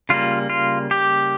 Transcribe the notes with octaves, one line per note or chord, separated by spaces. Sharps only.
C#3 G3 A#3 F4
F4
G4